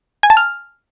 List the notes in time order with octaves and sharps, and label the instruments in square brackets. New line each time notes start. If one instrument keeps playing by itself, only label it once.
[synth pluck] G#5
A5
F6